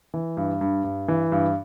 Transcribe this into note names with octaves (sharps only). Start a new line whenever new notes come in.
E3
G2
G2
G2
E3
G2